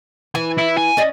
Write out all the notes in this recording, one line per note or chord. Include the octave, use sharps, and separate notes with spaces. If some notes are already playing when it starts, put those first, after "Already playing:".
E3 G#5
E4
G#5
C#4 D5 D#5